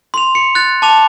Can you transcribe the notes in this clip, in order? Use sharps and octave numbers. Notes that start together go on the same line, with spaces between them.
C6 F7
C#7
F#6 A6
A5 D6 F7